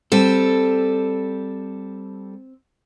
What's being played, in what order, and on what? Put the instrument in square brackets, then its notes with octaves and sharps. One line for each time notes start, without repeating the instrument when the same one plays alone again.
[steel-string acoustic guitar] G3 A4 [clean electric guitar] C4